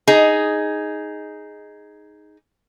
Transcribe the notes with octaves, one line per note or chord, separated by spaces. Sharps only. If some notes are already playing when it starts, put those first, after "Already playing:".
D#4 G#4